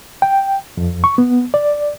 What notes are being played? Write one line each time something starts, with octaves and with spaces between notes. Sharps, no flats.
G5
F2
C#6
B3
D5